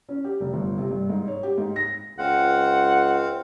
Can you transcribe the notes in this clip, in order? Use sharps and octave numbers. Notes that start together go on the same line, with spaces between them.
C#4
G4
F1
G1
C3
G2
G#2
C#5
G4
G#2
A#6
C#2 C4 C5 F5 F#5